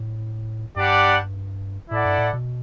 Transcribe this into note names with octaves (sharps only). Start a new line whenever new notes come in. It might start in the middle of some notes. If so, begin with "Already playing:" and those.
Already playing: A2
G2 G3 D4 G4 D5 F#5
A2 E4 A4 D5 F#5
G2
A2
B2